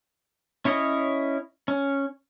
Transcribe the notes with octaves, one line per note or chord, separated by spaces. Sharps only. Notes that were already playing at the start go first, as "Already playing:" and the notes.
C#4 E4 C#5 D#5
C#4